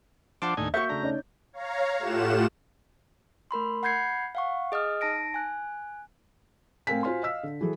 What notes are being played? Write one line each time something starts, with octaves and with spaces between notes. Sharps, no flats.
F3 D4 C5 F#5 A5 D6
D#2 A2 D4 D#4 G#5
A#3 F#4 C#5 E5 G6
C#3 A3 D4 A#5
C#4 D#4 D5
C#5 F5 A#5
A2 A3 F4 G4 F#5 E7
A3 A#4 B5 C6
F#5 B5 G6 G#6 C7 C#7
F5 F#5 C#6
G#4 D#5 D#6 F6
D#4 A5 A#6 D7
G#5 F#6
A2 C4 A#4 F5 G#5 B6
F4 F#4 C5 F5 G#5 C6
D#5 F5 E6 B6
D3
E3 F#3 G#4 A4